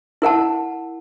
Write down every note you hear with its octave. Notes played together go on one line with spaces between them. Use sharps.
E4 A#4 F#5 A5